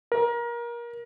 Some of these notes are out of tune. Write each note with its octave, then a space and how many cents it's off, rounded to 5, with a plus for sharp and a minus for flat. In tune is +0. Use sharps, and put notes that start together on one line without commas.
A#4 +25